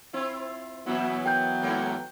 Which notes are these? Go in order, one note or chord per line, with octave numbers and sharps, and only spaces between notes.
C4 E4 F4
A#2 E3 F#3 B3 C#4 E4
A#4 G5 G6
G#2 A#3